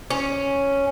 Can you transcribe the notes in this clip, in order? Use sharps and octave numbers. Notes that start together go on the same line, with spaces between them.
C#4